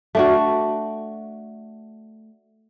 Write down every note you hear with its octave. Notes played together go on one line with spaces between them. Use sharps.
A3 D4 F#4